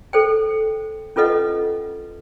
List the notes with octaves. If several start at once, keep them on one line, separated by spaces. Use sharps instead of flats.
A4 C5 G5
C#4 F4 A4 B4 D#5 F#5